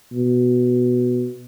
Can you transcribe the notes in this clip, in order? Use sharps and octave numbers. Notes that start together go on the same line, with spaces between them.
B2